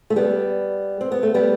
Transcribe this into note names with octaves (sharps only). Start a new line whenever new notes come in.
A3
G3 B3
C4
B3
A3
G3 B3